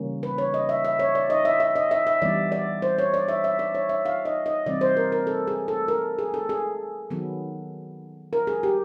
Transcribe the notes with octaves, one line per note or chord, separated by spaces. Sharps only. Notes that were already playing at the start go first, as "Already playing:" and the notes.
Already playing: C#3 E3 G3 A#3 C#4
B4
C#5
D#5
E5
E5
C#5
D5
D#5
E5
E5
D#5
E5
E5
E3 G3 B3 D5
D5
C5
C#5
D5
E5
E5
D5
C#5
E5
F5
D#5
D#5
C3 E3 G3 C4 D5
C5
A#4
A#4
A4
G#4
A4
A#4
G#4
A4
G#4
D#3 F#3 B3
A#4
G#4
G4